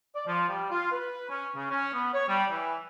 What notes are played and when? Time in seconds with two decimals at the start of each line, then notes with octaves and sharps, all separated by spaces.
0.15 D5
0.27 F3
0.49 G3
0.71 F4
0.92 B4
1.30 C#4
1.56 C#3
1.70 C#4
1.94 B3
2.14 C#5
2.28 G3
2.51 E3